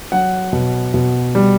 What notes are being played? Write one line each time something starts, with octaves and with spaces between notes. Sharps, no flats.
F#3 F#5
B2
B2
G3